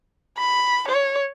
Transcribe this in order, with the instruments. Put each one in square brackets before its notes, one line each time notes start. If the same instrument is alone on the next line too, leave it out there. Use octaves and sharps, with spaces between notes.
[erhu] B5
C#5